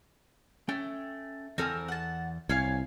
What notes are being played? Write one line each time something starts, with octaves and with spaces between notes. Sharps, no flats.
A3 C#4 G5
E2 C4 A4 A#4 G#5 F6
F#5 A5
C2 C#5 F5 G#5